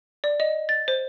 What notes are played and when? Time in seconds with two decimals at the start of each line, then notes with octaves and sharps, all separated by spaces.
0.24 D5
0.40 D#5
0.69 A6
0.88 C5